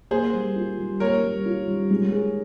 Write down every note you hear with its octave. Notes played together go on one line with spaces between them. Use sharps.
A#3 G#4 C5
G3
F4
G3
A#3 A#4 C#5
G3
F4
G3
G#3
G#4